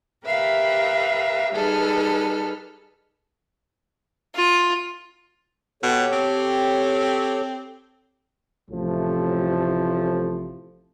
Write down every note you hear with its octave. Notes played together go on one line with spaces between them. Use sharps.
G4 A#4 B4 E5 F5
G3 D#4 G#4 A4 B4 F6
F4
B2 G4 A4 C#5
C4
A1 A2 C3 F3 A3